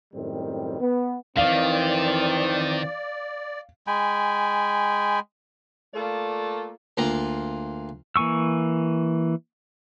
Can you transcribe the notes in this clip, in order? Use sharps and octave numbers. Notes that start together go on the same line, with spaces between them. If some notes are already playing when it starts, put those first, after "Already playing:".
F#2 A2 D#3 G3 C4
B3
F2 D#3 E3 C4 D5 F5
G#3 G5 G#5 B5
A3 A#3 F4 A4 D5
D2 A#3 F4 A#5
E3 A#3 G#5 C#6 E6